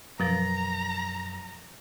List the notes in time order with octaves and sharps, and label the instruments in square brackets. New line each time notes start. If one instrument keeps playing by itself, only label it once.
[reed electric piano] F#2 [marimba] B2 F3 A6 [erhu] A#5